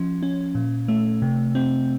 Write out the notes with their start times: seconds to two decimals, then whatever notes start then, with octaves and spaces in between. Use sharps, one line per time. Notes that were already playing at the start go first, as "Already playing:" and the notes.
Already playing: F3 C#4
0.23 C#4
0.55 A#2
0.88 A3
1.22 C3
1.55 C4